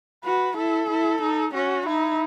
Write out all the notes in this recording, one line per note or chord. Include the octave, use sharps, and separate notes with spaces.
F#4 B4
E4 A4
E4
D#4
C#4 F#4
D#4 E4